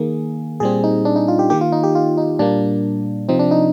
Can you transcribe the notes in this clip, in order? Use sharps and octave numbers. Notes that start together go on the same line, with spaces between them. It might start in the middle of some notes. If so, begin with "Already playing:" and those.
Already playing: D#3 A#3 G#4
A#2 G3 C4 G#4
D#4
D4
D#4
F4
G4
D#3 A#3 G4
F4
D#4
G4
F4
D#4
A#2 G3 A#3 D4
C3 F3 C4 D#4
D4
D#4